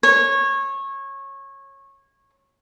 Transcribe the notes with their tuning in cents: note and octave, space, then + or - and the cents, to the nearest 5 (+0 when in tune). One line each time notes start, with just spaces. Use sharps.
C#5 -20